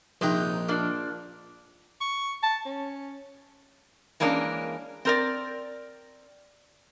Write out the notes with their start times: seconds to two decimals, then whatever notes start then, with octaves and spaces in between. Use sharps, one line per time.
0.21 A#1 C3 D#4 D#5 G5
0.68 F3 A#3 D4
2.01 C#6
2.43 A5
2.66 C#4
4.20 E3 G#3 A#3 C#4 D4
5.05 C4 A#4 D5